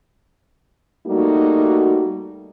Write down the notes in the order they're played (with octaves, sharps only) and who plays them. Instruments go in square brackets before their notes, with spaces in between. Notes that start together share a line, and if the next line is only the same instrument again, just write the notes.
[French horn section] G3 A3 A#3 D#4 F#4